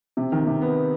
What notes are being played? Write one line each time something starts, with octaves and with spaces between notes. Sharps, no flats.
C3
D#3
C3
B3